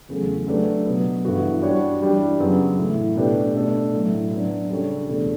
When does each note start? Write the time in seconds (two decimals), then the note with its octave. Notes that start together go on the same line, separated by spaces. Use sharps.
0.09 E2 C#3 F#3 A3
0.47 F#3 A3 D4 G4 B4
0.86 B2 F#3 B3
1.24 G2 E3 B3 F#4 A4
1.62 G3 D4 F#4 C#5
2.01 E3 G3 D4 G4
2.39 F#2 C#3 F#3 B3
2.78 A2 E3 A3
3.16 B2 A3 D4 G4 B4
3.55 B2 A3 D4 A4 D5
3.93 A2 F#3 A3
4.31 F#3 B3 D4
4.70 C#3 G3 D4 A4 C#5
5.08 E2 B2 A3 D4 A4